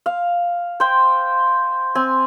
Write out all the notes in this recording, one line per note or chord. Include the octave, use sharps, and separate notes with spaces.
F5
C5 G5
C4 G#5